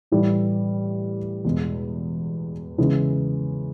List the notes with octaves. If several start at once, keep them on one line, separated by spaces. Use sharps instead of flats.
A2 E3 G3
E2 B2 G#3
C#3 E3 G#3 B3